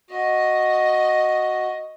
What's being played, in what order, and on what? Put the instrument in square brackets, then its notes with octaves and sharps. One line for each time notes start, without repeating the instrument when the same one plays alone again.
[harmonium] F#4 [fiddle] D#5